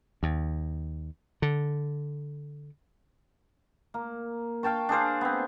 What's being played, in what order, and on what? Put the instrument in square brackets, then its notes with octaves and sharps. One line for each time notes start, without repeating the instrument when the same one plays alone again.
[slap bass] D#2
D3
[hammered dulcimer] A#3
F5 G5 A5 C#6
D4 G#4 C5 F5
B3 C4